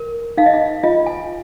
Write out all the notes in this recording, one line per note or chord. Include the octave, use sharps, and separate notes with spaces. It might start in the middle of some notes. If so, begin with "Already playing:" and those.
Already playing: A#4
D#4 F5
D#5
F5
F4 D#5
G#5